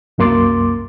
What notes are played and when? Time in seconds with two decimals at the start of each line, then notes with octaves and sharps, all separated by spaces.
0.18 C2 F#2 A#3 C6 D6 A6